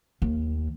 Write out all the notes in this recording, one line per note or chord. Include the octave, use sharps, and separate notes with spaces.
D#2